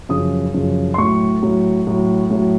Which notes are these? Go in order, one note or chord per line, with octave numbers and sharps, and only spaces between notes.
F#2 C#3 F3 D#6
F#2 C#3 F3
C6
A2 F#3 C#6
A2 F#3
A2 F#3
A2 F#3